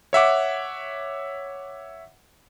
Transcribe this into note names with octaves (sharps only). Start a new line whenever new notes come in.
C#5 E5 F#5 D6